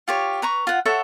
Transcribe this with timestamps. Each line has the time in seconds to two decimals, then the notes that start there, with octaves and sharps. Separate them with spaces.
0.08 F4 G4 C#5
0.42 B4 A#5 C#6
0.67 F4 F#5
0.85 A4 C#5 E5 F#5